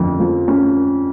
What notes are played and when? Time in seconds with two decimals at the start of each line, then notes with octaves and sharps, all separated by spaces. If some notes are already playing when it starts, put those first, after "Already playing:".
Already playing: F2 D3 C#4
0.20 F3
0.48 C#4